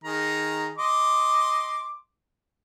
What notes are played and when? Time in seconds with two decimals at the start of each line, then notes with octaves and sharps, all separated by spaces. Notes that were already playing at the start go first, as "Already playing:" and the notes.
0.04 D#3 G#4 A#5
0.78 D#5 C6 D6